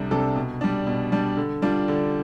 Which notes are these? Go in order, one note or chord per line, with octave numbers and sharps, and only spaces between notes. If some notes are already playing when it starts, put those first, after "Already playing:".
Already playing: C2 C3 G3 D4 A4
C3 G3 D4 A4
B2
G3 D4
B2
G3 D4
D3
G3 D4 F4
D3